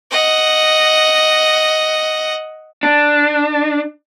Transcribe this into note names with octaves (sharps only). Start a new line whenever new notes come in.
D#5 F#5
D4